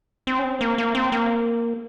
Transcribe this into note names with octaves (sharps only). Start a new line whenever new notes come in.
C4
C#4
C4
A#3
A#3
C4
A#3